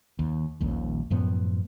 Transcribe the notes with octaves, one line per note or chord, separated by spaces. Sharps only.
D#2
D#1 A#1 D#2
F#2 A2 F3 B3